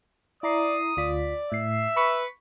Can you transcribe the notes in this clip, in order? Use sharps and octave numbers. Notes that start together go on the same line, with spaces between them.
E4 D5 A#5 D#6 C7
D2 F4 D5 B6
A2 E5 C7
B4 B5 C#6 B6